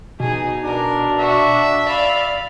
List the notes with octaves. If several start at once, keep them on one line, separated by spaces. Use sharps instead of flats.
B2 D#4 G#4
D4 A#4
F#4 E5
D5 F5 B5